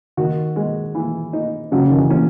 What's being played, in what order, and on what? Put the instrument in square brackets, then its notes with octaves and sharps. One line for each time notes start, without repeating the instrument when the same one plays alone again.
[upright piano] D#3 [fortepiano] F#4
[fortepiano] G#3
E3
D#4
[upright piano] C#3 [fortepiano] F#3
[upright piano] D#3
E3
[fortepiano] C#4